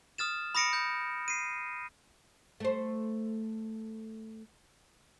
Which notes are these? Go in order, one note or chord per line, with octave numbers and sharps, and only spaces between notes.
D#6 F6 A6 E7
B5 D#6 A#6 C#7 D7
G6
C7 D#7
A3 C5